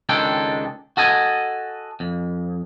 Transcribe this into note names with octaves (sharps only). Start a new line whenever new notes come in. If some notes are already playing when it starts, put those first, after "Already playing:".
C#2 D#3 G#3 D4 A4 G5
F#4 A4 D#5 G#5
F2